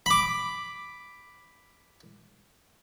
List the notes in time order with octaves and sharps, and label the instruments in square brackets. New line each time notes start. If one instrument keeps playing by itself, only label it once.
[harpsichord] B5 D6